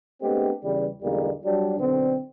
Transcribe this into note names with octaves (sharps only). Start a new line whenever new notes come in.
G#3 A3 B3 C4 D4 G4
E2 C#3 E3 G3
B1 E2 D3 G3 G#3 A#3
F#3 G3 D4
B1 D3 C4